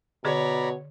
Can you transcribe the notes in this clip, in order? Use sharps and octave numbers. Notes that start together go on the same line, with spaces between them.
B2 D3 G#4 C#5 D5 A#5 B5